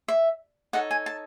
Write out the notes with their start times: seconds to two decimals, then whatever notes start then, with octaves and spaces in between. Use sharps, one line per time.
0.08 E5
0.73 D#4 A4 C#5 F#5
0.91 G#5
1.06 A5